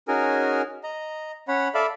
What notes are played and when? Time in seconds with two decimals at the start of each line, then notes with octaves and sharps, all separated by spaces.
0.08 C#4 D#4 F#4 G#4 A#4 G#5
0.83 D#5 A#5
1.48 C#4 C#5 F#5 B5
1.74 A4 D5 E5 F5 B5